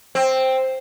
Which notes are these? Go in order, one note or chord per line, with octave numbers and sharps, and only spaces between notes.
C4